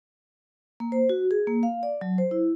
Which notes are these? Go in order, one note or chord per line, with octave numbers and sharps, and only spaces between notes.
A#3
C5
F#4
G#4
A#3
F5
D5
F#3
C5
E4